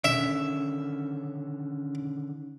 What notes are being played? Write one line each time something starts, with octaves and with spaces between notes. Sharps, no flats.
D3 D#3 C#4 E5